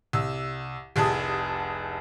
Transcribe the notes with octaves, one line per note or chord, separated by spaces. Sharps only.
C2 E6
F1 C2 G#4 A5 D#6